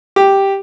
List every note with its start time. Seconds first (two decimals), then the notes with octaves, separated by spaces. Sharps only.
0.16 G4